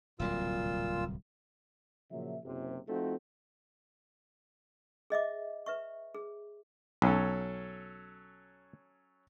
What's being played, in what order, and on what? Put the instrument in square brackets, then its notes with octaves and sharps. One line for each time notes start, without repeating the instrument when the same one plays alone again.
[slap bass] D1 C2 F#3 [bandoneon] A#2 F4 E6
[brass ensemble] A#2 C#3 F3 F#3 E5
F#1 C3
F3 A3 C4 D#4 F4 F#4
[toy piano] G#4 D#5 E5 D6
B4 E5 C#6
G#4
[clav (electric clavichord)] B1 [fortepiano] F#3 C#4 A4